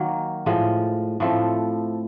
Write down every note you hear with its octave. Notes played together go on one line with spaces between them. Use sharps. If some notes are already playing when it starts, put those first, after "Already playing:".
Already playing: D#3 F#3 A#3
A2 F3 G#3
A2 F3 A3 C4